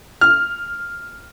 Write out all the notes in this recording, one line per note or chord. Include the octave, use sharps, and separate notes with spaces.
F6